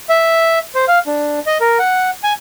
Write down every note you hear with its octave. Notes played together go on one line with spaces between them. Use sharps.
E5
C5
F5
D4
D#5
A#4
F#5
G#5